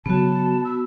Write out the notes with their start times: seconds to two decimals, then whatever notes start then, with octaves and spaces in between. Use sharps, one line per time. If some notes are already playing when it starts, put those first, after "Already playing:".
0.06 C#3 F#3 B3 F#4 A5
0.65 E6